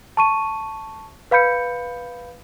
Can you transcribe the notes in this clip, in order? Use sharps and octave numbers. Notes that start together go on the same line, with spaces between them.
A5 C#6 D#7
B4 F5 B5 G6 C#7